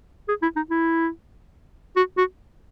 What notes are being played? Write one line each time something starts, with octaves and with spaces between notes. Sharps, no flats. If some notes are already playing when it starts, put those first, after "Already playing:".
G#4
E4
D#4
E4
F#4
F#4